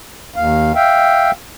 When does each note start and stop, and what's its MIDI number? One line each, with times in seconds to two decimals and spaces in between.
0.36 0.72 39
0.36 0.72 77
0.75 1.31 76
0.75 1.31 77
0.75 1.31 79